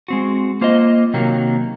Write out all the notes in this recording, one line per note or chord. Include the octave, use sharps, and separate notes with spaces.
G#3 C4 F#4
A#3 F4 C5 D#5
C3 D#3 F#3 A#3